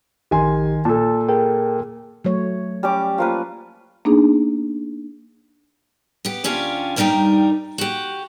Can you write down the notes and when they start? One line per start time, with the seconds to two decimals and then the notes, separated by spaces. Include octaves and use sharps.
0.31 A#1 D#3 G4 G#5 C6
0.85 A#2 A4 A5
1.29 G#4 A#4 G5
2.25 F#3 A3 C#5
2.83 G3 C#4 D6
3.18 F3 A#3 B4
4.05 A#3 B3 D4 D#4 G#4
6.25 B3 G4
6.44 D2 C#4 D4 F4 G4
6.96 G2 D#3 G3 D#4 A#4 G5
7.78 F#4 G4